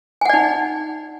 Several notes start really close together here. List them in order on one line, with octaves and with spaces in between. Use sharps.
G#5 F#5 D5 D#4